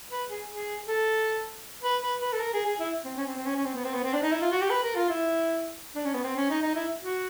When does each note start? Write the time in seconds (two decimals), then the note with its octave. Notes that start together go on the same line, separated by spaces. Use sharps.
0.11 B4
0.30 G#4
0.49 G#4
0.88 A4
1.83 B4
2.03 B4
2.21 B4
2.32 A4
2.40 A#4
2.53 G#4
2.65 G#4
2.79 E4
3.04 C4
3.17 C#4
3.26 C4
3.37 C4
3.46 C#4
3.56 C#4
3.65 C4
3.75 B3
3.84 C4
3.94 B3
4.04 C4
4.13 D4
4.22 D#4
4.32 E4
4.41 F4
4.52 F#4
4.61 G4
4.70 B4
4.83 A#4
4.95 F4
5.09 E4
5.95 D4
6.05 C#4
6.14 B3
6.23 C4
6.36 C#4
6.50 D#4
6.62 D#4
6.75 E4
7.01 F#4